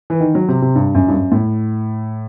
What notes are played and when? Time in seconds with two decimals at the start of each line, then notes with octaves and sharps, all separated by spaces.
0.10 E3
0.20 D#3
0.35 F#3
0.48 C3
0.62 C3
0.75 G2
0.95 F#2
1.08 G2
1.13 F#2
1.32 A2